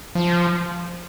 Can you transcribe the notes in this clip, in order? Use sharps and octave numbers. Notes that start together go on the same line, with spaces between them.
F3